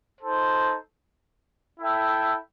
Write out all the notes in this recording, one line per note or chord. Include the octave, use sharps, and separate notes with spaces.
D#4 A4 C5
E4 A4 E5 G5